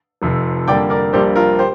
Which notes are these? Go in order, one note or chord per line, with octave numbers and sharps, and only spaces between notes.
F1 F2 C3 F3
F2 D3 G3 A#3 D5 G5
A#4 D5
A#1 A#2 G3 A#3 D4 G4 C5
F4 A#4
G4 C5